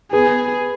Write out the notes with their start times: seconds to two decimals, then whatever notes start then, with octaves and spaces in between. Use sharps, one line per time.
0.12 B3 G#4